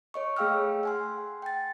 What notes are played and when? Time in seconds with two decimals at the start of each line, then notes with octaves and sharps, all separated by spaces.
0.14 C#5 D#5 C#6
0.37 A3 G#4 F5 G5 E6 F6
0.83 F#5 G#5 C6
1.42 G5 A6